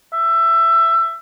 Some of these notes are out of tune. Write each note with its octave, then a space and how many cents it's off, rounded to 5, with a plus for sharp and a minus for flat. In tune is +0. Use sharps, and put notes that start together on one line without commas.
E5 +20